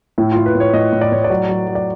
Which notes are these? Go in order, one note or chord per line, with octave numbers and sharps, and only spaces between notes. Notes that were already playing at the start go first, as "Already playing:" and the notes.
A2 E4
A2 F4
B4
A2
C#5
A2 D#5
A2
D5
A2 C#5
D5
F#3
F#3
F#3
D5